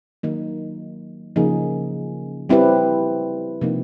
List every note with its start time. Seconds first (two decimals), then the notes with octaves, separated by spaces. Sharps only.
0.23 D#3 F#3 A#3 D#4
1.36 C#3 F3 A#3 D#4 G#4
2.49 G3 C4 E4 G4 B4
3.61 C3 F3 A#3 D#4